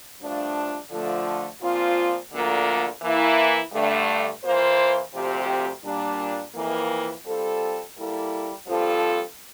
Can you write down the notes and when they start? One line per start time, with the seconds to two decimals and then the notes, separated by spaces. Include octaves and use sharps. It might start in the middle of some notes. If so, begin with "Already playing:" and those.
0.20 G2 F3 A3 D4 F4
0.91 D3 F3 A3
1.61 A#2 F3 C4 F4
2.32 D2 D3 F3 A#3
3.02 E3 A#3 E4
3.73 G2 D3 A3
4.44 E3 A#3 F4 C5
5.14 D2 C3 F3 C4 G4
5.85 A#2 G3 D4
6.55 F2 E3 A#3
7.26 G3 C4 F4 A4
7.96 G3 A#3 E4 A4
8.66 G2 F3 C4 F4 A4